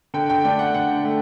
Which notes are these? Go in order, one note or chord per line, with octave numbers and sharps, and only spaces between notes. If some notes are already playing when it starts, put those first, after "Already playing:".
D3 G5
G5
A3 D4 G5
F#5
D3 F#5
A3